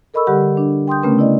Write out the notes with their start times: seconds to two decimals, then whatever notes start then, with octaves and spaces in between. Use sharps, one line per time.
0.14 A4 A#4 D#5 B5 C#6 E6
0.26 D3 G3 G4 F#5 B5
0.57 D4
0.88 G5 C6 D#6 G6
1.03 C#3 A3 B3 C#4 A#4 B4
1.19 E4 D5 D#5